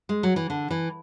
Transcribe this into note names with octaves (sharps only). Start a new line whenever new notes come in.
G#3
F#3
E3
D3
E3